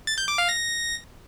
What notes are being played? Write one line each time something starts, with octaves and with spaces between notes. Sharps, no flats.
A6
G6
D6
F5
A#6